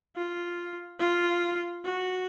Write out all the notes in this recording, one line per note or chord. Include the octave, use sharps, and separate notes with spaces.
F4
F4
F#4